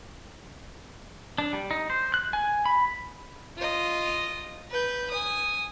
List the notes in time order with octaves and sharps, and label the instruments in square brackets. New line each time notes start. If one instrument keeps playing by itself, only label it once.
[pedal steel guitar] D4
G3
D#4
C5
F#6
G#5
B5
[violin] F4 D#5
B4 G6
G#5 D#6